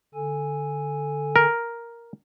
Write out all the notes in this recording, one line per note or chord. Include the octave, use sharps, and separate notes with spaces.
D3 A4 G#5
A#4